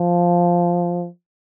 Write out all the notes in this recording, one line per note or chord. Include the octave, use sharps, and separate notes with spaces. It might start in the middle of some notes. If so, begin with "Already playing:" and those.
Already playing: F3